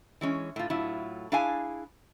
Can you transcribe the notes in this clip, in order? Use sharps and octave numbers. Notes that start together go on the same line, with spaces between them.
E3 G#3 C#4
A2 F4
A2 F#3 E4 F4
D4 E4 G#4 F5 G#5